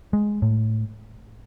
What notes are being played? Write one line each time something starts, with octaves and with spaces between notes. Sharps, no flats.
G#3
A2